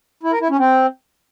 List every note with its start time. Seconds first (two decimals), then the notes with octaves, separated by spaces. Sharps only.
0.23 E4
0.32 A#4
0.41 E4
0.50 C#4
0.59 C4